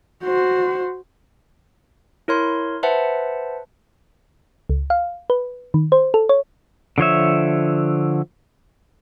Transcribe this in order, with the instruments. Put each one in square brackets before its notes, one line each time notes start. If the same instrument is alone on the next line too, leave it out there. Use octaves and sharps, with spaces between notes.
[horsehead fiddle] F#4 C5
[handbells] E4 A#4 C#5 C6
B4 C5 E5 F#5 A5
[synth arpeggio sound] C#2
F5
B4
D#3
C5
A4
C#5
[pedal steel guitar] D3 F3 C#5 E5